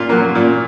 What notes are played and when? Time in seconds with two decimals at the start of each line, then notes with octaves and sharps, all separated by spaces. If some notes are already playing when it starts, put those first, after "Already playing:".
Already playing: A#2 F4
0.09 F#3 A#3
0.35 A#2